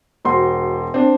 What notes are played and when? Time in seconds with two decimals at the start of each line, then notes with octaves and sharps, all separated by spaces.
0.25 E1 F#4 C5 C6
0.94 C4 D4